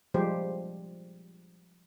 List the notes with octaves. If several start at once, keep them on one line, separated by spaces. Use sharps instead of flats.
F3 G3 G#3 G4 C5